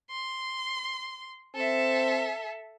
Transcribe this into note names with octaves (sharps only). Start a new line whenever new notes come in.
C6
C4 A4 E5